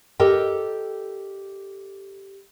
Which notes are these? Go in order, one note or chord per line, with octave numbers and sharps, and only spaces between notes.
G4 A4 A#4 D#5 G5